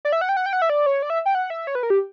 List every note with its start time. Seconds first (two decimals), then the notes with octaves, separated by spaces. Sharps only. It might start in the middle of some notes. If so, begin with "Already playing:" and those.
0.05 D5
0.12 E5
0.21 F#5
0.29 G5
0.37 F#5
0.46 G5
0.53 F#5
0.62 E5
0.70 D5
0.86 C#5
1.02 D5
1.10 E5
1.26 G5
1.35 F#5
1.50 E5
1.67 C#5
1.75 B4
1.83 A#4
1.90 G4